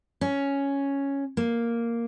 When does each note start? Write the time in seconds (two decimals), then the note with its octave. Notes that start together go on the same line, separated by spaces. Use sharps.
0.21 C#4
1.37 A#3